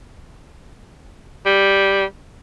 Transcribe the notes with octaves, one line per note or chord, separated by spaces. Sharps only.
G3